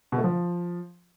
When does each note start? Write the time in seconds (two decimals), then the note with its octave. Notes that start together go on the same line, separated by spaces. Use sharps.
0.12 B2
0.18 A3
0.24 F3